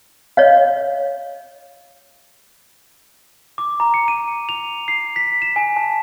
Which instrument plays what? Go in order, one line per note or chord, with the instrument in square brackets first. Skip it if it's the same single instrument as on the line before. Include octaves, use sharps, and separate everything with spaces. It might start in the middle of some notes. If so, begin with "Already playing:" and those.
[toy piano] C#5 D#5 F5
[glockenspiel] D6
A#5
C#7
D#7
F7
C7
B6
E7
G#5
A5